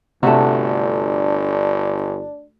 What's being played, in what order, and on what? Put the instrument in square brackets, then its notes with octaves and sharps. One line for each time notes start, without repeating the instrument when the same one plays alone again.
[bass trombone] G1 [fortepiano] C3 [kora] A3 F#4 [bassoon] D4